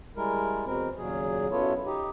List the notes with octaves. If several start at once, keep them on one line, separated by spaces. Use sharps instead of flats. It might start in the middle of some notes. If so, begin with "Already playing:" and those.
G3 G#3 E4 A#4
E2 B2 C4 A#4
D#2 A#2 C#3 F#3 G#4
F#2 B3 E4 F4 A4 C#5
D#4 G4